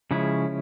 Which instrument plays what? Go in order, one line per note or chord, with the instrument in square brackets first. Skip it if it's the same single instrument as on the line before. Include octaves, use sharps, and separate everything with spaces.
[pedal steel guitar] C#3 F3 G#3 C#4 E4